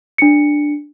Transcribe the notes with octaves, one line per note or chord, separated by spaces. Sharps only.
D4 C#7